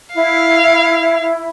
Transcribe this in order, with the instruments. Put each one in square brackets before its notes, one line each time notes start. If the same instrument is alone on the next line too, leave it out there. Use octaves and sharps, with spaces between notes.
[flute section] E4 [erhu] F5